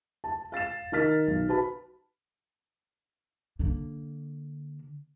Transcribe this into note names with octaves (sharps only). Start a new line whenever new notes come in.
A5
F5 A6 C7 E7
D#3 D#4 A#4 F6 A6 B6
B1
F#4 B4 A5 B5
D3 A#3